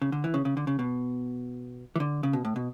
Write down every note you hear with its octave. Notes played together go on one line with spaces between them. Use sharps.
C#3
D3
E3
C#3
C#3
D3
C#3
B2
E3
D3
C#3
B2
A2
B2